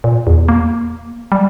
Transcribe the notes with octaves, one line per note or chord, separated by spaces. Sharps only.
A#2
E2
A#3
G3